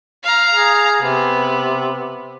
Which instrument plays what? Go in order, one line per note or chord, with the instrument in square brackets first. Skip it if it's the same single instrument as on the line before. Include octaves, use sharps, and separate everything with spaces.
[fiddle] F5 A#5
[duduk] G#4
[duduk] C3 [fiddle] B3